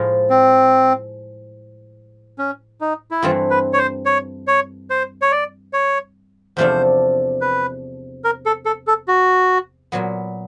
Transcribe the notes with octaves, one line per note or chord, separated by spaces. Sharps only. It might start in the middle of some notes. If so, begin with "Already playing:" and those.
Already playing: A2 F3 G#3
C4
C#4
D#4
E4
G2 E3 A3 C4 F4
B4
C#5
C5
C#5
C#5
C5
C#5
D5
C#5
E2 C3 F3 A3 D4 C5
B4
A#4
A4
A4
A4
F#4
A#2 F#3 B3